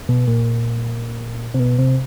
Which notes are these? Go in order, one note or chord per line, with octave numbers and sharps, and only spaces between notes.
B2
A#2
C3
B2
C3